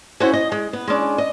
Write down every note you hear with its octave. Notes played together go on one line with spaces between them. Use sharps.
C#4 E4 F#4 A4 C5 F#5
D#5
G#3
B3
G#3 C#4 D4
D#5